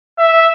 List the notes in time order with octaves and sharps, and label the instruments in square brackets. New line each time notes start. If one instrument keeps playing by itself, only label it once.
[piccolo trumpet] E5